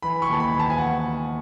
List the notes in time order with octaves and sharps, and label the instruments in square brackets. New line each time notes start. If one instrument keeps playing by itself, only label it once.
[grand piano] E3 B5
C#6
D#2 A5
B5
D#2
A5
G#5
E3 F#5